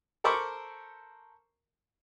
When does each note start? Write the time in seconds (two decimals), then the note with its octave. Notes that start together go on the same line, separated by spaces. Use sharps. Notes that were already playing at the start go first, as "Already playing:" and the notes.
0.24 A4 A#4 C5 B5 C#6 D6